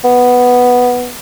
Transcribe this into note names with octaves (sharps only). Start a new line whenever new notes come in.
B3